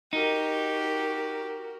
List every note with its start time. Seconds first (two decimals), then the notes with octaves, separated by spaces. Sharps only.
0.13 D#4 F#4 G4 A#4